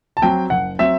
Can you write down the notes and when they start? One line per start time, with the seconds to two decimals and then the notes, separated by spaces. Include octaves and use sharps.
0.17 A5
0.22 F#3 C4 G5
0.50 F#1 F#5
0.79 F#3 C4 E5